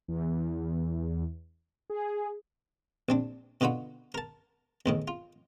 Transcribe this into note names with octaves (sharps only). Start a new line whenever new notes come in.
E2
G#4
A#1 C4 D4
B2 D3 F4 F#4 B5
A#4 A5
E2 A2 D#3
F4